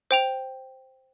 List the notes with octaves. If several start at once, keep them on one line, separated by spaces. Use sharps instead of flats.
C5 G5 F7